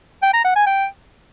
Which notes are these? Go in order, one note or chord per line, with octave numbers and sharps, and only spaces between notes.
G5
A#5
F#5
G#5
G5